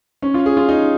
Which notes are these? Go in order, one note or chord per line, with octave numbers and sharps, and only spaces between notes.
C#4
F4
G#4
F4
D#4